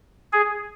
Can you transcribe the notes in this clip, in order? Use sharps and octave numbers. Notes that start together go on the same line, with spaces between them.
G#4